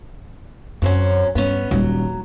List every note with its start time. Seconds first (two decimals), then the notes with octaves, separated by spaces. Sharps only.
0.82 F#2 F#3 C4 C#4
1.35 G2 B3 C#4
1.71 D#1 F#3 G3